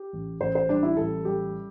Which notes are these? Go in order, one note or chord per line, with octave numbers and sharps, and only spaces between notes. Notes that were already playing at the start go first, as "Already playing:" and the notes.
Already playing: G4
A1
A1 C5
C5
G3 D4
E4
A1 A4
G3 G4